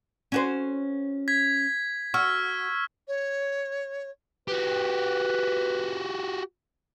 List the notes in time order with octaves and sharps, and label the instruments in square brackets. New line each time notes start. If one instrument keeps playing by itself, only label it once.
[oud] C#4 F#4 C5
[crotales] G#6 B6
[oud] F#4 [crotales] C#6 E6 F6
[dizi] C#5
[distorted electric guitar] F#4 G4 [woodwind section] B4